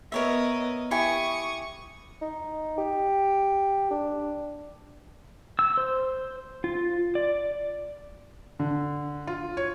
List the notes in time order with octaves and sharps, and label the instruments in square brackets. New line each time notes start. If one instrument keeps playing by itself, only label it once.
[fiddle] B3 D#5 [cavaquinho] A#4 C#5 E5
[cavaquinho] E4 G4 G#5 [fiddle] C#6 D#6
[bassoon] D#4
G4
D4
[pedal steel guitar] E6
C5
F4
D5
[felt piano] D3
F4
C#5